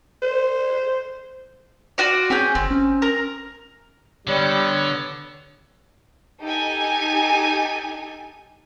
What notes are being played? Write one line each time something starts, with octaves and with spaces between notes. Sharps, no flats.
C5
F4 F#4 D5
C4 C#4 G#4 G6
G1 C4
C#4
A#4
D3 G3 B3 C#5
D#4 G4 A4 G#5